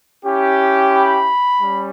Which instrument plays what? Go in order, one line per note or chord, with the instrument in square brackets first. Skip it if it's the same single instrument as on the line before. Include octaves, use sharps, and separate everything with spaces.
[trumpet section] C#4 E4 G4
B5
G3 C#4